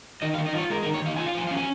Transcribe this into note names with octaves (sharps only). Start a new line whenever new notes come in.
D#3 D#5
F5
D#3
D#5
F4 C#5
G#3 A#4
A#4
D#3
C#5
D#3 F5
F4 G#5
F5
F3 G#5
C#4 F5
G#5